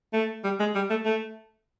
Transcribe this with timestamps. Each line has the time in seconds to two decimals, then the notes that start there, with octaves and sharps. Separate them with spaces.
0.14 A3
0.44 G3
0.60 G#3
0.75 G3
0.90 A3
1.05 A3